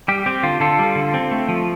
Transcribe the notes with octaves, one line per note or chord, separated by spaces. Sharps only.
G3 G4
C4 G4
D3 F4
D3 F4 A4
G3
D3
C4
A3
F3